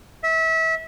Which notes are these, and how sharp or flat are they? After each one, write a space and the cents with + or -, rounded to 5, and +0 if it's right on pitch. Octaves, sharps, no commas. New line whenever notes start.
E5 -25